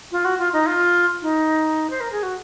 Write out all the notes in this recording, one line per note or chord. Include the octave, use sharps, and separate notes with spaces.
F4
F#4
F4
D#4
F4
D#4
C5
A#4
G#4
F#4